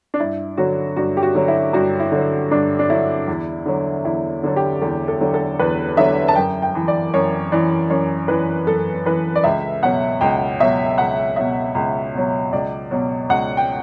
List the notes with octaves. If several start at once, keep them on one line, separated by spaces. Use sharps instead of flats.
D4
G2 E4
D3 F#3 F#4
G2 F#4
G4
F#4
D3 F#3
E4
G2 F#4
E4
D3 F#3
G2 D4
D4
D3 F#3 E4
E2
D3 F#3
E2 E4
D3 F#3 A4
G4
E2 A4
A4
D3 F#3
A4
E2 B4
D3 F#3 E5
A5
F#2 G5
G5
E3
D5
F#2 C#5
E3 D5
F#2 C#5
E3 B4
F#2 A4
E3 B4
D5
C#2 E5
B2 F#3 F#5
C#2 G5
B2 F#3 E5
C#2 F#5
B2 F#3 E5
C#2
B2 F#3
C#2 D5
B2 F#3
C#2 F#5
G5